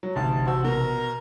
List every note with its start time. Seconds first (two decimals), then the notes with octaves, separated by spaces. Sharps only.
0.03 F#3
0.16 A1 D2 C3 D#4 A5
0.47 F#4 C5 A5 E6
0.64 B2 A#4